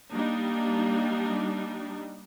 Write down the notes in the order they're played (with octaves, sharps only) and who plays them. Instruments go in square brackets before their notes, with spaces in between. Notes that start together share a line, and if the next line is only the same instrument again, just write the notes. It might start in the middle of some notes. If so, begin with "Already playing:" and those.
[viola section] G3 D4 D#4 [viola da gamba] A#3